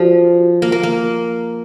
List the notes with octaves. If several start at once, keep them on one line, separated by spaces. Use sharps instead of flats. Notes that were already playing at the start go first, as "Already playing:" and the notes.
Already playing: F3 F#4 A4 D5
A#3
A#3
A#3